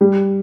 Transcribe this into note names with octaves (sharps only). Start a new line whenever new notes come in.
G3